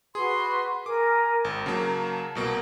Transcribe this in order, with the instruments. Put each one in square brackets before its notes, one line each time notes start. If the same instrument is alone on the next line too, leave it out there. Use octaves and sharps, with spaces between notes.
[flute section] F#4 B4 C6 [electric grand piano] G#4
[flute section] A#4 G#5 [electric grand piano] D6
[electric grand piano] G#1
[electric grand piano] C#3 F#3 A#3 [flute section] A5
[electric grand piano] C2 B2 A#3